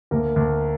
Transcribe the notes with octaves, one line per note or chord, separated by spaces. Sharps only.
D2 A#3 A#4
D2